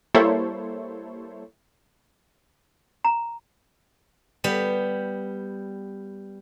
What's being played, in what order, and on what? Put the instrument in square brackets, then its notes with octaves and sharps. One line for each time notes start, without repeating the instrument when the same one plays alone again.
[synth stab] G3 A#3 E4 A4 C5 C#5
[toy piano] A#5
[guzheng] G3 B3